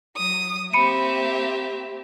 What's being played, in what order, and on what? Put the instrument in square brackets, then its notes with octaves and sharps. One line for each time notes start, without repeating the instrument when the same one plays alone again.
[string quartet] F#3 [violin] D#6
[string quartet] A#3 C4 G4 [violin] E5 [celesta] B5 C#7 D#7